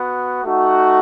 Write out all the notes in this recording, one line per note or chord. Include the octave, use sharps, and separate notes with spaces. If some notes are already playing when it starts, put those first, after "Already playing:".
Already playing: B3 F#4
A3 D#4 F#4